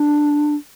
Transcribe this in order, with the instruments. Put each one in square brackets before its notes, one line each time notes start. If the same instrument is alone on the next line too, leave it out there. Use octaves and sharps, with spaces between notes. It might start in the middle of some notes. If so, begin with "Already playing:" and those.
Already playing: [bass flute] D4